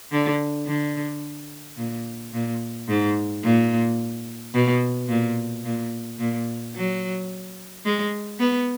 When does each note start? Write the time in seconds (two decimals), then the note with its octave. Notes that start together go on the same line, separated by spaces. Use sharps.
0.12 D3
0.67 D3
1.77 A#2
2.33 A#2
2.88 G#2
3.43 A#2
4.54 B2
5.09 A#2
5.64 A#2
6.19 A#2
6.75 F#3
7.85 G#3
8.39 B3